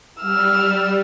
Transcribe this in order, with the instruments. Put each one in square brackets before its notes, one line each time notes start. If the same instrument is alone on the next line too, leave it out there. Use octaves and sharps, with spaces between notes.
[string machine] G3 [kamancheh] E6 F6